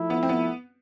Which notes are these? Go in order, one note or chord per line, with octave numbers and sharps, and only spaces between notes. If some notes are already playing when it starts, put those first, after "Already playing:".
Already playing: F3 A3 E4
B3
C4
B3